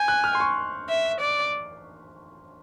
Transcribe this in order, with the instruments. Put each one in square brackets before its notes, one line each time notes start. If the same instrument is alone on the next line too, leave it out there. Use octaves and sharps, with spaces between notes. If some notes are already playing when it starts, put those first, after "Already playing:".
Already playing: [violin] G#5 [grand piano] G6
[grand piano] F#6
F6
C6
C#6
[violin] E5
D5